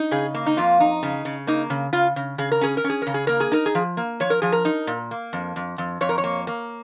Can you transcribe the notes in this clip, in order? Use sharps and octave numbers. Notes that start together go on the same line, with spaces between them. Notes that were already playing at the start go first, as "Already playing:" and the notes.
Already playing: D#4
C#3 G#4
A#3
D#4
F2 F4
D#4
C#3
C#3
A#3 D#4
C#3
C#3 F4
C#3
C#3 G#4
A#4
C#4 G#4
A#4
C#4
G#4
C#3 A#4
G#4
A#3 A#4
G#4
D#4 A#4
G#4
F3
A#3
F3 C#5
A#4
F3 G#4
A#4
D#4
A#2
A#3
F2
F2
F2
F2 C#5
A#4
C#5
A#3
A#3